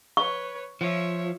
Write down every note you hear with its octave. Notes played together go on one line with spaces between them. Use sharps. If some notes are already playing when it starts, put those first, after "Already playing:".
B4 C#5 C#6
F3 C#5 E5